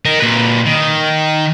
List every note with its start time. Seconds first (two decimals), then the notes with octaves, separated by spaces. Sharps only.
0.05 A#4 D#5
0.20 A#2 B4
0.66 D#3